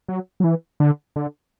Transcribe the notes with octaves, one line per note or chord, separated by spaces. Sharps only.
F#3
F#3
E3
D3
D3